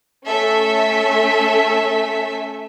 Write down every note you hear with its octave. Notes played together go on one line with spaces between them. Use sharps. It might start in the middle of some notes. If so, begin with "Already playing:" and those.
A3 C#4 A4 E5 B6